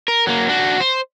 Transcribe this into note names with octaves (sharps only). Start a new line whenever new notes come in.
A#4
F#3 A#3
D4 F#4
C5